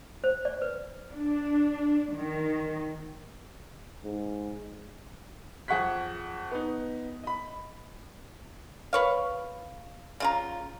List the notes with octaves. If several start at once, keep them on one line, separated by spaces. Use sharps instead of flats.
C5
D5
B4
D4
D#3
G#2
F2 G#4 F#5 C#6 F#6 B6
B3 D#4
D#5 B5
B4 C#5 F5
C#3 F4 A#5